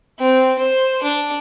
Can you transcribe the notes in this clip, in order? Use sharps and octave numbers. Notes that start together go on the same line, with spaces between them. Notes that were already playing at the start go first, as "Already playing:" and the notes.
C4
C5
D4